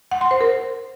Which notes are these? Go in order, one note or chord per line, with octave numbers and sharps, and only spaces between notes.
F#5
C6
C5
A#4